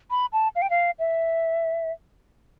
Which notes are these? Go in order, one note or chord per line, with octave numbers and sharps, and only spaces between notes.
B5
A5
F5
G5
F5
E5